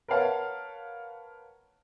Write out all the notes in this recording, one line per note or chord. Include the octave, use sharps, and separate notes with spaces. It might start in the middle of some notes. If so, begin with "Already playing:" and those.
A#4 B4 C#5 F5 F#5 A5